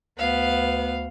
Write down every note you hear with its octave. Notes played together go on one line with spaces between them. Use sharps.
D2 B3 F5